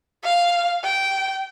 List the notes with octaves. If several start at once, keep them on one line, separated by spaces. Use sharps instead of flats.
F5
G5